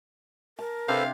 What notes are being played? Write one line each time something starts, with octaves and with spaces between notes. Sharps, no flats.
A#4 A5
C3 D4 A4 B4 C5 F5